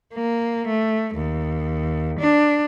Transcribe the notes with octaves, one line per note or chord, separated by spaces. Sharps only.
A#3
A3
D#2
D4